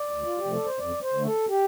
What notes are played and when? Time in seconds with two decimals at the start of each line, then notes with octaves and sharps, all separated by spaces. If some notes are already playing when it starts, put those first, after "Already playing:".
Already playing: D5
0.11 D2
0.25 F4
0.38 G4
0.45 C3 F3 A3
0.52 A4
0.65 C5
0.79 F2 D5
1.02 C5
1.14 D3 A3
1.25 A4
1.49 G4